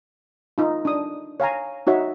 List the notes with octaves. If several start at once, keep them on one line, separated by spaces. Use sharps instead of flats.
D#4 F4
D4 D#6
C#5 F5 G#5 A#5
D#4 F#4 C#5 E5